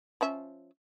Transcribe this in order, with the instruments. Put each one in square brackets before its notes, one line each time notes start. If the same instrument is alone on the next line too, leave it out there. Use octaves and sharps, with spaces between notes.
[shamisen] F3 C#4 E5